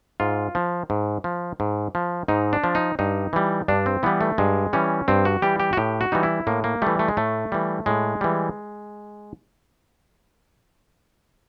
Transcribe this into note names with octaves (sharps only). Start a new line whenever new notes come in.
G#2 F4
F3
G#2
F3
G#2
F3
G#2 D#4
D4
F3
D#4
G2 D#4
E3 G3
G2 D4
C4
E3 G3 B3
A3
G2 G#3
E3 G3 C#4
G2 C4
F#4
E3 G3 G4
G4
F#4
A2 G4
F#4
E3 G3 D#4
E4
A2 A#3
A#3
E3 G3 A3
A3
G#3
A2 A3
E3 G3
A2 G#3
E3 G3